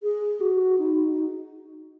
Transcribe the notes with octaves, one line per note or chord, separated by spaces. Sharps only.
G#4
F#4
D#4
D#4